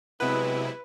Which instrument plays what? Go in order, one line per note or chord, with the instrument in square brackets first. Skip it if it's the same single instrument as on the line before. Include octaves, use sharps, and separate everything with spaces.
[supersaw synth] C3 E4 [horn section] F#3 G#3 B3 [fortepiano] B4